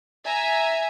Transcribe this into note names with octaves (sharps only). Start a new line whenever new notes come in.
E5 G#5 A#5